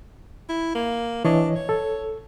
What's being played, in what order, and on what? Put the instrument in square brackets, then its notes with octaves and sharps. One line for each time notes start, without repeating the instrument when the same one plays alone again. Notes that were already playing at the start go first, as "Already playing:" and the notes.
[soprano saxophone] E4
A#3
[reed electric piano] E3 C#5 D#5 [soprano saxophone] D4
[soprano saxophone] C#5
[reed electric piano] A4